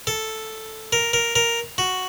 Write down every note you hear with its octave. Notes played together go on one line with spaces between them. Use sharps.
A4
A#4
A#4
A#4
F#4